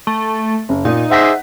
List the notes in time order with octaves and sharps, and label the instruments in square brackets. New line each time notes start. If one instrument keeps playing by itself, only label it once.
[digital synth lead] A3
[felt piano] F#1
[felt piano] A#2 [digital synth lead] D#4
[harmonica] G#4 C5 E5 [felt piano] F#5 A#6 B6